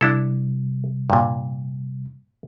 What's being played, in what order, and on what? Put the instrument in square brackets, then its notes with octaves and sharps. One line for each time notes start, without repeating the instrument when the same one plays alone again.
[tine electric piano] C3 G3 [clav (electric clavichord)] D4 E4 A4
[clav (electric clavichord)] G2 A#2